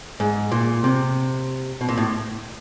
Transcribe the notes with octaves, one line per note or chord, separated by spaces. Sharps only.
G#2
A#2
C3
B2
A#2
A2